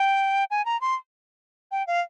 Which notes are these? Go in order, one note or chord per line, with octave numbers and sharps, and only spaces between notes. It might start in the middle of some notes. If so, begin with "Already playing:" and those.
Already playing: G5
G#5
A#5
C6
G5
F5